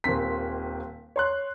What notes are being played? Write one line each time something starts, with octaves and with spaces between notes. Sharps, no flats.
D#1 A#2 C4 B6
C#5 C6 F#6